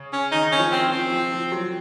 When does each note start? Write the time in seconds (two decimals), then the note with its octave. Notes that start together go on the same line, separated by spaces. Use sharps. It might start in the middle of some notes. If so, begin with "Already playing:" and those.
Already playing: C#3
0.13 C#4
0.32 D#3 D#4
0.52 C#4
0.59 F3
0.72 C4
0.86 F3
0.91 C4
1.11 F3
1.32 F3
1.52 F#3